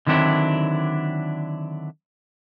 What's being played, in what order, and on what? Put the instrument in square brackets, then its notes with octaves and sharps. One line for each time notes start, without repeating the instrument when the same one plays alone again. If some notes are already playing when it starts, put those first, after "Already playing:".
[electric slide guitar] D3 D#3 F#3 C4 D4 E4